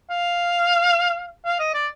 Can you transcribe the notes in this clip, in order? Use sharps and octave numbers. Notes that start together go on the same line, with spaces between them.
F5
F5
D#5
D5